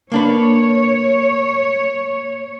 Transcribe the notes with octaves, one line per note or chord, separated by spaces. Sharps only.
A#3 D4 B4 C#5